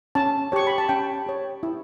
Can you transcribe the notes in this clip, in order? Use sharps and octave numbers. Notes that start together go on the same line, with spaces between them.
C#4 A5
G4 C#5 C#6
B5
A5
C#4 G5
G4 C#5
E4